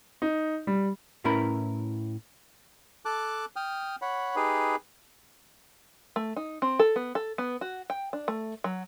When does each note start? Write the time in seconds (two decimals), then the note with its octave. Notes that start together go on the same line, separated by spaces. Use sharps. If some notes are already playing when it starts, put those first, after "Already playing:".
0.22 D#4
0.67 G3
1.25 A2 C#4 E4 A#4 B4 B5
3.05 A4 A5 D6 F#6
3.56 G5 D#6 F6
4.02 C#5 F#5 B5
4.36 D#4 G4 G#4 B4
6.16 A3
6.36 D#4
6.62 C4
6.79 A4
6.96 B3
7.15 A4
7.38 B3
7.61 F#4
7.90 G5
8.13 D4
8.28 A3
8.64 F#3